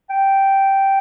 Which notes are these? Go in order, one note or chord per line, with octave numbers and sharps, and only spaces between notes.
G5